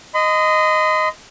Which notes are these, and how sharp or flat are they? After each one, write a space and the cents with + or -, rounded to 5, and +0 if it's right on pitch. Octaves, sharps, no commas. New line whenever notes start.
D#5 +0 C6 -45